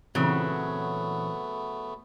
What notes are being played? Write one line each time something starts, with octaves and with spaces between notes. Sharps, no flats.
A#2 C#3 E3 F#3 A3 B3 C4